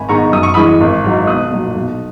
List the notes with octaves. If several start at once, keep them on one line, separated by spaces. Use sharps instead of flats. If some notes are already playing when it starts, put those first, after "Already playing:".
Already playing: G#1 G#5 B5
G#2 D#3 G#3 B3 A#5 C#6
F#2 D#6
C#6
E3 G#3 B5 D#6
G#1
G#2 F#3
B1 D#6 F#6
A#2 F#3
B1